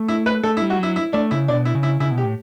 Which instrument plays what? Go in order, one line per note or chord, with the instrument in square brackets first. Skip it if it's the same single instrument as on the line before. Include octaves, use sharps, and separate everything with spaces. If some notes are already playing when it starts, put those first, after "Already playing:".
Already playing: [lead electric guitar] A3
[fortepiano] E4
B4
[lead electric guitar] A3 [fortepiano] A4
[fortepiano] E4
[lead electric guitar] G3
[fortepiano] F#4
[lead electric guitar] F#3 [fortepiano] E4
[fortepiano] E4
[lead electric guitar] A3 [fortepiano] D4
[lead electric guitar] C#3 [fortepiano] E4
[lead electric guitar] B2 [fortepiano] D4
[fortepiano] E4
[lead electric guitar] C#3
[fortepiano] E4
[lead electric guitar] C#3 [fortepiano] E4
[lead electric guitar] B2
[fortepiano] G4
[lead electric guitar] A2